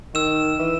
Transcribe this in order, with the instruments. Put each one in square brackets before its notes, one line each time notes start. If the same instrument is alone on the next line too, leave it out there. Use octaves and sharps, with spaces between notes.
[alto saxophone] D#3 [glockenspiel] E6 E7
[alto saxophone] E3